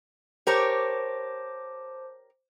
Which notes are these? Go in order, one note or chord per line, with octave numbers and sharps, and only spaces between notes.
G4 A#4 C5 C#5 A5 D6